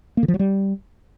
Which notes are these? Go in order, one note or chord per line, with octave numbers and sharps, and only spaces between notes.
A#3
D3
F3
F#3
G3